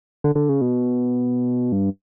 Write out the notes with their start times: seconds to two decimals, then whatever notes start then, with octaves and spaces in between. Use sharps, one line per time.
0.24 D3
0.35 D3
0.49 C#3
0.61 B2
1.72 G2